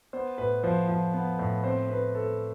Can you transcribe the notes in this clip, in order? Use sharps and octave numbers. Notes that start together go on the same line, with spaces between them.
B3 C5
A2 B4
F3 C5
F3
B3
A2
C4 C5
C4 B4
A3 A4